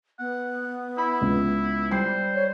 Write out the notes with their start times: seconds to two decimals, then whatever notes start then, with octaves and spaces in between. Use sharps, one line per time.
0.19 B3 F#5
0.98 E4 B5
1.21 C#2
1.91 G3 C5 C7
2.35 C#5